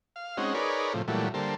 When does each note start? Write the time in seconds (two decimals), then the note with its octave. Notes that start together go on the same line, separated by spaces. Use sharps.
0.16 F5
0.37 G#3 C4 C#4 D#4 F#4
0.54 D#4 G#4 A#4 B4 C#5 D5
0.94 A2 C3 F3
1.08 A#2 E3 F#3 G3 A3
1.34 D3 G3 A#3 A4 C5